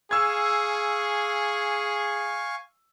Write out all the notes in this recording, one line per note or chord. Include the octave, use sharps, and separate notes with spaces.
G#4 F5 G#5 C#6 E6 G#6